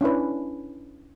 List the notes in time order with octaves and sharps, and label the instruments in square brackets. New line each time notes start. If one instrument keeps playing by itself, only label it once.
[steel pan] C#4 D4 E4 B4